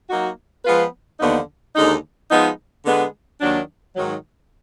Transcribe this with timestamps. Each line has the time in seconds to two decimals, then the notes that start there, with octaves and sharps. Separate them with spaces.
0.10 F#3 A#3 D#4 F#4
0.65 F3 G#3 B3 F4 B4
1.20 D#2 D3 F3 B3 D#4
1.75 D#2 D3 G#3 D#4
2.31 F3 G#3 B3 D#4
2.85 D3 G#3 B3
3.41 D#2 D#3 F#3 D4
3.96 G#2 D#3 F#3